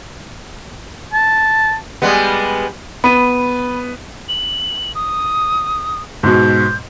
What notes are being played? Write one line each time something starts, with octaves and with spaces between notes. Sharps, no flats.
A5
G3 G#3 B3
B3 B5 D#7
F#7
D#6
G#2 B2 G6